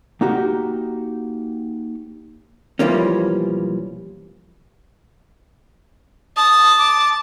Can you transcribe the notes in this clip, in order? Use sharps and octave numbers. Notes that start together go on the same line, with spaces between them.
A#3 D#4 F#4 G4
B1 E3 F3 G3 A#3 C#4
A5 D#6
D6